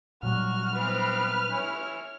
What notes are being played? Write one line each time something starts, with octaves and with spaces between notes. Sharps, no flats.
A#2 F#3 G3 F#4 F6
E3 B3 C4 B4
E4 C#5 G#5